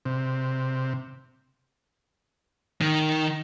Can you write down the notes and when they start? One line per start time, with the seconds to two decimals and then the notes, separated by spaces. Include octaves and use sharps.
0.05 C3
2.81 D#3